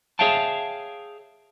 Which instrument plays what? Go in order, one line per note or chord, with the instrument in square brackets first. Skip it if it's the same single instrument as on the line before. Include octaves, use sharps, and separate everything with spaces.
[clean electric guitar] G#4 C#5 E5 F5 G5 A5